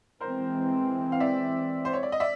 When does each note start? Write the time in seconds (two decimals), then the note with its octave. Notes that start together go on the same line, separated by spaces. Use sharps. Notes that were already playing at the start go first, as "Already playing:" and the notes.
0.20 E3 G#3 C4 A#4 C5
1.12 F5
1.20 D5 E5
1.85 C5
1.93 C#5
2.03 D5
2.12 D#5
2.20 D5 E5